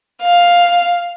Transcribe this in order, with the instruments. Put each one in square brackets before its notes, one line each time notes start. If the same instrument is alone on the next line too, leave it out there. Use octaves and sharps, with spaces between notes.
[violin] F5